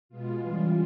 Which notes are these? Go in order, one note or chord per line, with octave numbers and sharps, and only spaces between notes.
B2 G#3 B3 F4
C#3 E3 G3 F4